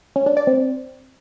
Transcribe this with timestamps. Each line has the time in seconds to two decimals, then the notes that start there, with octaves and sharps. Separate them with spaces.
0.16 C#4
0.26 D4
0.37 D5
0.47 C4